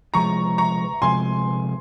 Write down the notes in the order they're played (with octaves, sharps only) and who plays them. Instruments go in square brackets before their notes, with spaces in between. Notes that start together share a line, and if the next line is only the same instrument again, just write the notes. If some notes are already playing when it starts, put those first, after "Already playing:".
[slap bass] C3 F3 G#3 [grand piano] A#5 C#6
[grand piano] A#5 C#6
[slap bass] C3 F3 G#3 [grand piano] G#5 C6